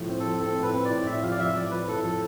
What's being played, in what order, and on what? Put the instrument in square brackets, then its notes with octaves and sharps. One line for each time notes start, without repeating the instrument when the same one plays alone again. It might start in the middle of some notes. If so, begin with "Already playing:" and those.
Already playing: [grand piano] A2 F3
C4
[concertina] A4
[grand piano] F3
[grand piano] C4 [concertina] A4
[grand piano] A2 [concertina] B4
[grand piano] C4
[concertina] D5
[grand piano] A2
[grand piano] A2 [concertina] E5
[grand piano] F3 [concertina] F5
[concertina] D5
[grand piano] F3 [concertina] E5
[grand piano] F3 [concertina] D5
[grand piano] F3 [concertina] B4
[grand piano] A2 [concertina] A4
[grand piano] F3 [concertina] A4